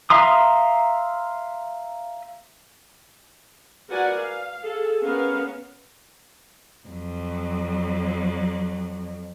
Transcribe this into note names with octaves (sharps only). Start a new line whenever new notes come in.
E5 F5 A#5 C6 D#6
F#4 A#4 B4 D5 F#5 G#5
F5
G#4 A4
B3 C#4 A#4 F5
F2 F#3